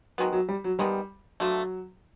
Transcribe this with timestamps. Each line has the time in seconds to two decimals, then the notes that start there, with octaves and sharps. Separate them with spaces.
0.18 D#3 F#3 G#3 B3
0.33 F#3
0.49 G3
0.64 F#3
0.79 D#3 G3 G#3 B3
1.40 D3 F3 F#3 A3